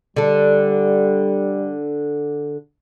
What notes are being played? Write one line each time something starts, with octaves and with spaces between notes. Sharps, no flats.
D3 G3 A4